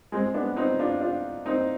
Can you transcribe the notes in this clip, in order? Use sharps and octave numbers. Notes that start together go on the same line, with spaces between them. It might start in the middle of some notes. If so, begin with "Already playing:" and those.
G#3 C4
B3 D4
C4 D#4
D4 F4
D4 F4
C4 D#4